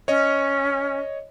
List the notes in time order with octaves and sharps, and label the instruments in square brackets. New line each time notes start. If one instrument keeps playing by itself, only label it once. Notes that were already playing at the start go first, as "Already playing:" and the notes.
[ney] C#4 [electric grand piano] C#5 D#5